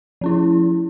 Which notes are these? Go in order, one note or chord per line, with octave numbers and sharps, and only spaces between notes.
F3 C#4 E4